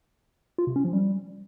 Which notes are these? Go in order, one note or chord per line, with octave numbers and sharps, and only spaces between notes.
F4
C3
C#4
F3
G3